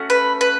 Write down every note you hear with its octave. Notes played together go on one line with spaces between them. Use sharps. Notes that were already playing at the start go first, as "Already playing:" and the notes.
Already playing: A3 C#4 F#4
B4
B4